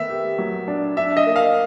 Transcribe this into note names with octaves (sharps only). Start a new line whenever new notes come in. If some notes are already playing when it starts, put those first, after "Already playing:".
Already playing: D#3 A3 B3 E5
G4
F#3
D4
D4 E5
D#5
A#3
F5